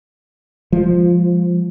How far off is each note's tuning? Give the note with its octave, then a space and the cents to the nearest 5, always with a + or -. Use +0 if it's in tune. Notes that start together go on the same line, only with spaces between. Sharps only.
F3 +0 G#3 -30